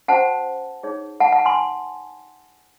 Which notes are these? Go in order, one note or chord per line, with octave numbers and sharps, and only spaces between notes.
C#4 F#4 C5 F#5 A5
D#4 G#4 C#5
F#5 A5
F#5 A5
G#5 C6